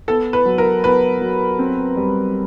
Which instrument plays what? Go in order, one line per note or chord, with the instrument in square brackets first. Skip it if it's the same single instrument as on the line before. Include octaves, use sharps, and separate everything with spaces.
[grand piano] B3 [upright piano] A4
[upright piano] B4
[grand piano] F#3
[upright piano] A#4
[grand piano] B3 [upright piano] B4
[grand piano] F#3
C4
G3